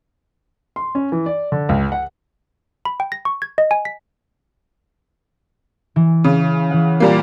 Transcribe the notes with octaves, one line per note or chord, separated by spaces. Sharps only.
C6
C#4
E3
D5
D3
C#2
F#5
B5
G5
A#6
C#6
G#6
D#5
G#5
B6
E3
C#3
E3 F#5
A#2 G3 A#3